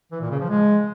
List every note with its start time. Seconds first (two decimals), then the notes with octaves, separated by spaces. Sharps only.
0.12 E3
0.21 A#2
0.31 C#3
0.40 F3
0.50 G#3